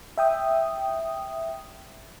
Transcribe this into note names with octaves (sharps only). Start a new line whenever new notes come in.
E5 G5 D#6